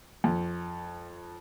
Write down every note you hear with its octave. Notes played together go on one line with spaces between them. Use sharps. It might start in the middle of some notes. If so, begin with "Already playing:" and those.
F2